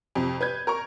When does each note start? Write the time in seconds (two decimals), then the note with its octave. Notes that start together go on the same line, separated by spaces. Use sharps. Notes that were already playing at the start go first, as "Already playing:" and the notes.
0.15 F2 C3
0.41 B4 G6 G#6
0.67 A#4 A#5 C#6